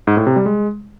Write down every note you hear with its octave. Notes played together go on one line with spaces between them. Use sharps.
G#2
A2
C3
G3
G#3